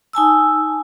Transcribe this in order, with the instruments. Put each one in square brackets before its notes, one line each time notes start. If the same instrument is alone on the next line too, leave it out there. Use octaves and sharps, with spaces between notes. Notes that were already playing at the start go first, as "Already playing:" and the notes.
[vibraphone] D#4 G#5 A5 E6